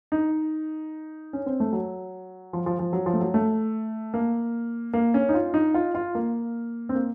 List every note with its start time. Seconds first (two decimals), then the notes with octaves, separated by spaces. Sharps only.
0.12 D#4
1.33 C#4
1.46 C4
1.60 A3
1.73 F#3
2.53 F3
2.66 F3
2.79 F3
2.93 F#3
3.06 F3
3.14 A3
3.20 F#3
3.34 A3
4.14 A#3
4.93 A#3
5.14 C#4
5.29 D#4
5.34 F4
5.54 D#4
5.74 F4
5.95 F4
6.15 A#3
6.89 C4
6.95 A#3